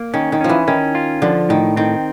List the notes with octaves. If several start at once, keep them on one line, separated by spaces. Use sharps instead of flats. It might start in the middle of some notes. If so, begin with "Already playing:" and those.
Already playing: A#3
D#3 C#4
D#3
F3 C#4
E3
D#3 C#4
F4
D3 F3
A2 D#3
D#3 C4